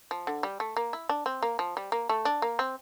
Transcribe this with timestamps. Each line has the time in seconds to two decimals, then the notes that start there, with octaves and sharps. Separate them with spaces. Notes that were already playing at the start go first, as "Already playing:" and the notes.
0.11 F3
0.27 D3
0.43 G3
0.60 A3
0.76 A#3
0.93 E4
1.09 D4
1.26 C4
1.43 A#3
1.59 F3
1.77 G3
1.92 A#3
2.09 A3
2.25 D4
2.42 A#3
2.59 C4